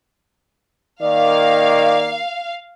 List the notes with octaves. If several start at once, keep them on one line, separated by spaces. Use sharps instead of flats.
D#3 A#3 D5 F5